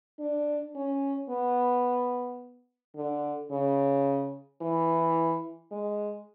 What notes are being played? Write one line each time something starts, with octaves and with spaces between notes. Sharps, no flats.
D4
C#4
B3
D3
C#3
E3
G#3